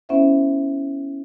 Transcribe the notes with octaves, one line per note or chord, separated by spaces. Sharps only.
B3 C#4 E4 C5 E5 F#5